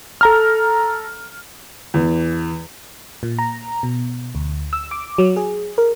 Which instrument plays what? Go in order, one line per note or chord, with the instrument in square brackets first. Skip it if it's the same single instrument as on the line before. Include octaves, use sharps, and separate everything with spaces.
[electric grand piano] A4 A#5 F6
[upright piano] E2
[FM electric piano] A#2
A#5
B2
D2
E6
D6
F#3
G#4
A#4